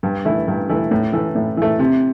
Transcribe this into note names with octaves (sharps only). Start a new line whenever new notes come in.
G2
E3 A3 E4
G2
E3 A3 E4
A2
E3 A3
A2
E3 A3
C3